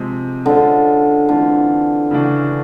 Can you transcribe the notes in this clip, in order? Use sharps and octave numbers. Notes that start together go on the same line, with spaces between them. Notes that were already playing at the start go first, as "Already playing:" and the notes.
Already playing: C3 F3 G#3 C4
D3 G#3 C#4 F4 A4 C5
D3 E3 A3 C4 F4
C#3 E3 A3 D4 F#4